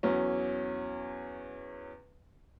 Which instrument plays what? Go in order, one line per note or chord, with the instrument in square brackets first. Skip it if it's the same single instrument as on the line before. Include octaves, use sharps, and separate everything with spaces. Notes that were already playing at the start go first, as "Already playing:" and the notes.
[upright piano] E2 F#3 C#4